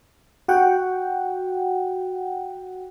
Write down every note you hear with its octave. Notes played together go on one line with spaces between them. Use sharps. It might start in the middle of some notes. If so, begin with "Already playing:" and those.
F#4 F#5 G5